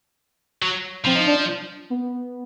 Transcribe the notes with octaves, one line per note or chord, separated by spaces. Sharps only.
F#3
F3 C4
D#4
D4
B3